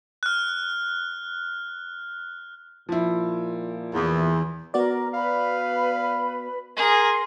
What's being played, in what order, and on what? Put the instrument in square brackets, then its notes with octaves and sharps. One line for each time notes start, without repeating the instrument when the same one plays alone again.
[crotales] F6 F#6
[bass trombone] A#2 [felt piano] F3 E4
[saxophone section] E2 [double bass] E3
[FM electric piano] B3 F#4 D5 [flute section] A#4
[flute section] B4 B5 [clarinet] F5
[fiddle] G#4 [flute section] A#4 C6